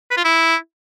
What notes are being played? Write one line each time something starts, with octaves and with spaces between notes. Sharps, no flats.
B4
F4
E4